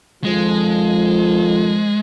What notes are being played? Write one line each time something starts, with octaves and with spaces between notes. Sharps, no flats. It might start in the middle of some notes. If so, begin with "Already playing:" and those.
F2 D#3 F3 G#3